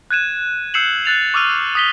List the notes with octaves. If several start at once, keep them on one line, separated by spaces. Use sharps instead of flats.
F#6 G#6 D#7 E7
E6 G6 C7 C#7 E7 F#7
F#6 A6 F7
C#6 D6 E6 F6 D#7 F7
D#6 B6 G7